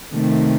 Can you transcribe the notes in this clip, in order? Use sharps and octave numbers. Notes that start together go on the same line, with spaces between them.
C3 D#3 A3